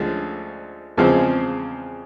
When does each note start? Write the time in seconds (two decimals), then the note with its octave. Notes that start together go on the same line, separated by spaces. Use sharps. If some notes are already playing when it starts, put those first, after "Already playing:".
Already playing: D2 D3 F3 G#3 C#4
0.97 E2 C#3 F3 G#3 C4